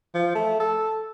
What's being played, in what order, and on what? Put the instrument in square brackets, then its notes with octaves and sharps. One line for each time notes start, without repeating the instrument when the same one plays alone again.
[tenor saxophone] F3
A3
A4